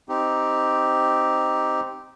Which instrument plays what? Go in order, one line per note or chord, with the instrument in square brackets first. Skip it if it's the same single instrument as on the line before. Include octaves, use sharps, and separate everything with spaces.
[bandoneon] C4 D#4 G4